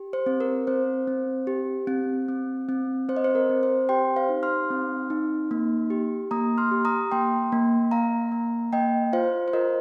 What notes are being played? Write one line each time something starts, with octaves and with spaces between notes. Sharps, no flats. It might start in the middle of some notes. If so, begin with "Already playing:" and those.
Already playing: G4
C5
C4
A#4
C4 C5
C4
G4
C4
C4
C4
C4 C5
D#5
C5
A#4
C4
C5
G4 G5 C6
C5 F5
D#4
C6 F6
C4
D#4
A#3
G4
A#3 A#5 D#6
C6 F6
G4
A#5 D#6
A#3 G5 C6
A#3
A#3 F5 A#5
A#3
A#3 D#5 G5
F4 C5 F5
C5
F4 A#4 D#5